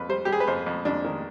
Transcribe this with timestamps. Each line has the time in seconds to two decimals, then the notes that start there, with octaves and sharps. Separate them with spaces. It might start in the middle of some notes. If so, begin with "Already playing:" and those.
Already playing: F2 B4
0.09 G3 C5
0.25 G4
0.28 G3 G#4
0.40 B4
0.47 F2 C5
0.66 F2
0.85 F2 D4
1.04 D#3